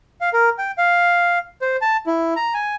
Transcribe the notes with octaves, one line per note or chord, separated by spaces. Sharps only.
F5
A#4
G5
F5
C5
A5
E4
A#5
G#5